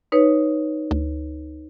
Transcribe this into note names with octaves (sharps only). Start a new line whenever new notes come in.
D#4 B4 C#5
D2